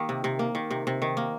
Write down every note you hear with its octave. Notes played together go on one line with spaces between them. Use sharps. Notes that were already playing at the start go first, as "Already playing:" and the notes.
Already playing: D#3 A#3 G4
C3
C3
A#3
D#3
C3
C3
D#3
A#3